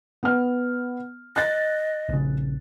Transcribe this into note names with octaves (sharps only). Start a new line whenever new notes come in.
B3 F6
D#5 F#6 A6
A#1 C#3